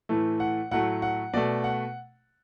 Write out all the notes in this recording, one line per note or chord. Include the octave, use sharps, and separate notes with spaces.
A2 E3 A3
F#5
A2 F#3 A3 F#5
F#5
B2 A3 D5
F#5